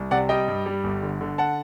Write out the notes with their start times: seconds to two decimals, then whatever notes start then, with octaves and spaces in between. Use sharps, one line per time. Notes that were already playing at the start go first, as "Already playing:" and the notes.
Already playing: C2
0.11 C3 D5 F#5
0.29 G3 D#5 G5
0.48 G2
0.66 G3
0.84 G1
1.03 D3
1.21 D3
1.38 F#5 A5